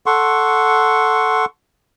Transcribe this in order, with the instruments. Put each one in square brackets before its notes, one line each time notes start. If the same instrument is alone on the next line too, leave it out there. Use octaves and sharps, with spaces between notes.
[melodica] A4 F#5 C6 C#6